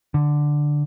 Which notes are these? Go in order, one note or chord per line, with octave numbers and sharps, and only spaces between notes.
D3